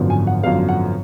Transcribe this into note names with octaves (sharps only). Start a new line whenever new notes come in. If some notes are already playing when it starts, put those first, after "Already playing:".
Already playing: G#1 F#2 D3 F3 B3
G#5
F#5
G#1 F#2 D3 F3 B3 F5
F#5